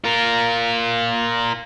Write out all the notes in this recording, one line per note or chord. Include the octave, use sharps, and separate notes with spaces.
F4 A#4